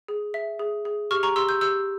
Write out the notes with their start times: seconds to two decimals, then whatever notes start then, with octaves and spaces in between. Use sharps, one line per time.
0.08 G#4
0.34 E5
0.59 G#4
0.85 G#4
1.11 G4 C#6 F6
1.23 A#5 C#6
1.36 G4 C6 E6
1.49 E6 G6
1.61 G4 E6 G6